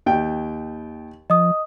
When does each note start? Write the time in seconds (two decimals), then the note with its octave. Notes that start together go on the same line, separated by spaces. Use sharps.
0.06 D#2 G5
1.30 F3 D#5 D#6